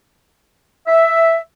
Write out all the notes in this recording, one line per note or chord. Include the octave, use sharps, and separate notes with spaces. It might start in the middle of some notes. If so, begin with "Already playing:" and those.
E5